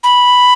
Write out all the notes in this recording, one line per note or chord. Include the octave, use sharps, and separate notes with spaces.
B5